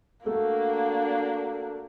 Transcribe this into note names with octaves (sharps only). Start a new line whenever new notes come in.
A3 A#3 D4 F#4